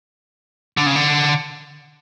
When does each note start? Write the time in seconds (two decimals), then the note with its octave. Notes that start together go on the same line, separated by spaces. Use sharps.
0.77 D3
0.86 C#3
0.96 D3